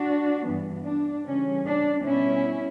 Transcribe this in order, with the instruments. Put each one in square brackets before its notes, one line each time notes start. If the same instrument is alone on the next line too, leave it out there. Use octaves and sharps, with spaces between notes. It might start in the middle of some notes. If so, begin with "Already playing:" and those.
Already playing: [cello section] D4 F#4
G2 E3 B3
D4
C#3 E3 G3 C#4
D4
B2 G3 B3 C#4 E4